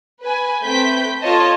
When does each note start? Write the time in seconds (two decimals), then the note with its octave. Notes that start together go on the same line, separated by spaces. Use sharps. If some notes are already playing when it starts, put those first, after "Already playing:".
0.22 B4 G#5
0.63 A3 C4 B4 G5 G6 B6
1.21 F4 A4 C#5 D#5 A5